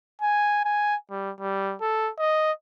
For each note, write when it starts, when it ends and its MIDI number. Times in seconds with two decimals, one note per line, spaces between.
0.22 0.62 80
0.65 0.95 80
1.11 1.31 55
1.40 1.75 55
1.81 2.10 69
2.19 2.52 75